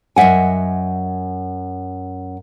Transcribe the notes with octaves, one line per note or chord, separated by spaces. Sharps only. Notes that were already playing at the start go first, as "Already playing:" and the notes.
F#2 D#5 E5 F#5 G#5